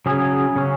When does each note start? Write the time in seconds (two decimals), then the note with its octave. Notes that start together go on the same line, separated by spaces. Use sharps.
0.06 C#3 F#3 C#4 G#4
0.56 C#3 F#3 C#4